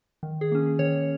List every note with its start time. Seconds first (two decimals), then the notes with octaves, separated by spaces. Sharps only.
0.23 D#3
0.41 G#4
0.52 A#3 C#4
0.79 D#3 C#5